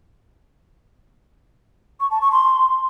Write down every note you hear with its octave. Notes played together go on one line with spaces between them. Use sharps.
C#6
A5
C#6
C6